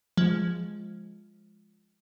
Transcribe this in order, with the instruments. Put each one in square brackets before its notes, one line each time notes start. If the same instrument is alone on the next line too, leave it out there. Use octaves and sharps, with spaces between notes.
[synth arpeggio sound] F3 G#3